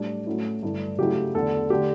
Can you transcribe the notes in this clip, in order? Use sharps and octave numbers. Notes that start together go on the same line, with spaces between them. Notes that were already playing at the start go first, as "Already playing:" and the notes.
Already playing: A2 G3 D4 A4
A2 F#3 A3 C#4 E4
G2 D3 A3 E4
C#3 F#3 A3 E4 G4
E2 D3 A3 A4
D3 A3 G4